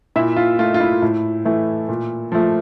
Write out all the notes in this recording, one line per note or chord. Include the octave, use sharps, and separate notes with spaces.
A#2 E4 E5
F4
A3 F4
F4
E4
A2
E3 A3
A#2
F3 A3